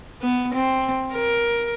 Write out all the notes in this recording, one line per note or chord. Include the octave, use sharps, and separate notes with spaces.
B3
C4
A#4